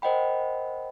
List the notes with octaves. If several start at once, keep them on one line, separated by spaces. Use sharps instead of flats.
A#4 C5 D#5 F#5 G5 B5